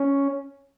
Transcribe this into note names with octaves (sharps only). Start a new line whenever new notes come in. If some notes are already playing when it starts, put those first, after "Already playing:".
Already playing: C#4